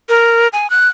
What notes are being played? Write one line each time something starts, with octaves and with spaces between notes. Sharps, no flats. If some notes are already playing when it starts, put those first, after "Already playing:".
A#4
G#5
F#6